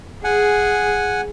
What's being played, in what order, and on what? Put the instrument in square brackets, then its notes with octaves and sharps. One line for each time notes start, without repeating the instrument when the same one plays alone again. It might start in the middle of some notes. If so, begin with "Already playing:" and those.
[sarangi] G#4 [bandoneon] F#5 G#5